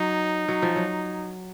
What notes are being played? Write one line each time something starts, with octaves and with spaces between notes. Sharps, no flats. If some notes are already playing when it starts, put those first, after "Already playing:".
Already playing: F#3 D#4
F#3
F3
F#3